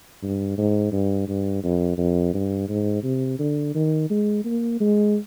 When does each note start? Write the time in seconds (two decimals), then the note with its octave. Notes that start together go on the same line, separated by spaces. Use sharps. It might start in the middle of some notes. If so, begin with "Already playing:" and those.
0.23 G2
0.58 G#2
0.92 G2
1.28 G2
1.63 F2
1.98 F2
2.34 G2
2.69 G#2
3.04 C3
3.39 D3
3.75 D#3
4.10 G#3
4.45 A#3
4.80 G#3